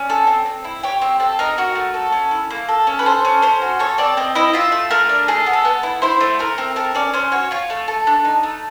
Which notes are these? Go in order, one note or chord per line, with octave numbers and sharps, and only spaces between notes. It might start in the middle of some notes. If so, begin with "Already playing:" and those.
Already playing: C#4 D5
A4
C4
C4
E4
G4 C#5
C4
C4 A4
D#4 A#4
F#4
A3
A4
C#4
E4
A#3
A4
C#4
B4
A4 C5
C#4
C#4 C5
F#4
A4 C#5
C4 D5
C4 D#5
E4 D#5
F4 E5
A3
A3 A#4
D4
G#4 A4
B3
A4
B3
E4
E4 C5
A3
A3 A#4
C4
A4 A#4
C#4 D5
C#4 C5
F#4 C#5
F4 C#5
A3
A4
D4
D#4
A3